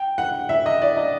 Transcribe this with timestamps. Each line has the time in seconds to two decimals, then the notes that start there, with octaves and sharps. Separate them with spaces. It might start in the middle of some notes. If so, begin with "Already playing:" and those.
Already playing: G5
0.18 F#5
0.49 E5
0.66 D#5
0.82 D5
0.97 D#5